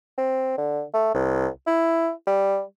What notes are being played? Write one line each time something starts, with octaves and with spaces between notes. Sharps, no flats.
C4
D3
A3
C2
E4
G3